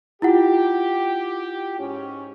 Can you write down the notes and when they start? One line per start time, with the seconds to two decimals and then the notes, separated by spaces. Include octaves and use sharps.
0.22 E4 F4 G4 F#5
1.79 G#2 C#4